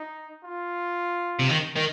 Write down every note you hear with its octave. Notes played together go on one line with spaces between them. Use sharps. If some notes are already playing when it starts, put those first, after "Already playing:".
Already playing: D#4
F4
C3
D#3
D#3